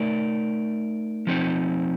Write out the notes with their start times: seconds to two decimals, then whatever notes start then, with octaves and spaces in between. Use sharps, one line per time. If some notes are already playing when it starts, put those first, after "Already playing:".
Already playing: A3 D#4 A#4 D5
1.27 F3 C4 D#4